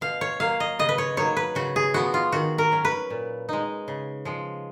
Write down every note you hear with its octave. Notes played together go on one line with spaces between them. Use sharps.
B2 F5
C#5
F#3 A#3 F5
D#5
C#3 D#5
B4
C#5
F#3 A#3 D#4 C#5
B4
C#3 F#4
G#4
F3 B3 F#4
F4
D#3 F#4
A#4
F#3 C#4
B4
A#2
G#3 D#4
C#3
F3 G#3